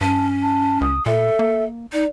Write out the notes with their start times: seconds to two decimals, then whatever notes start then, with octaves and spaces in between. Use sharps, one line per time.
0.01 G2 C#4 A5
0.42 A5
0.81 C#2 D#6
1.06 A#2 A4 E5
1.39 A#3
1.93 D#4 D5